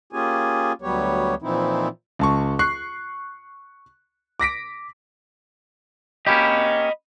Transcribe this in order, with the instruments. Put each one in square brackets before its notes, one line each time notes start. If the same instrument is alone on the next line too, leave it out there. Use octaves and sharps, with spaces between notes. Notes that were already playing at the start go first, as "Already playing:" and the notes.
[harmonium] A#3 C#4 F4 G4 G#4 G#5
D2 F#3 G3 B3 G4 C#5
A#2 E3 F3 C4 D#4 E4
[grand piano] C#2 A5 C#6
C#6 F#6 C7
D6 A#6 B6 D7
[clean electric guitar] A#3 C#4 G4 [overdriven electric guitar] D#5 B5